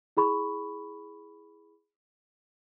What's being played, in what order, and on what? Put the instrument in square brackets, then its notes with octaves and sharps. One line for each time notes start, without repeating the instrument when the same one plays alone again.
[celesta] E4 G#4 B5 C#6